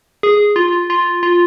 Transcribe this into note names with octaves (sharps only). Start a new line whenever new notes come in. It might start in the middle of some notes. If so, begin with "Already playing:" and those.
G#4
F4
F4
F4